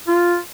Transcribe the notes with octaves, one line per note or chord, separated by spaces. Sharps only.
F4